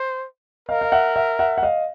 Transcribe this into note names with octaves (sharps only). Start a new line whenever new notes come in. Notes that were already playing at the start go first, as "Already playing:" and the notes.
Already playing: C5
A#4 D#5 F5
F5
E5 F#5
E5 F#5
E5 F#5
F#5
D#5 F5